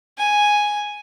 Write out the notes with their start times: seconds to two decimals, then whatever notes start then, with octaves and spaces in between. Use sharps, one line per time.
0.18 G#5